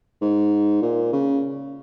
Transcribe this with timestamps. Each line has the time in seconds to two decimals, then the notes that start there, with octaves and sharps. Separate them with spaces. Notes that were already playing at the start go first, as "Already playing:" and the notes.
0.22 G#2
0.82 A#2
1.13 C#3